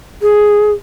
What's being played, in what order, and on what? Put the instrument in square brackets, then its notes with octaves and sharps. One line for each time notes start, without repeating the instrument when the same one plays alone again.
[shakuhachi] G#4